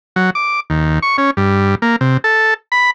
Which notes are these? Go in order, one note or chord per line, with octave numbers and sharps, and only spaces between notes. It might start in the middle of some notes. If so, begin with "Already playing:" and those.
F#3
D6
D#2
C#6
C#4
G2
A#3
C3
A4
B5